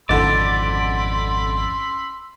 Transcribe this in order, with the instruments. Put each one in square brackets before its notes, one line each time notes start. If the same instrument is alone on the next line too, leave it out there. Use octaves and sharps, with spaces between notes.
[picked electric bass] G#1 F2 [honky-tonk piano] D3 D#4 [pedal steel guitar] D5 [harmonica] B5 C6 E6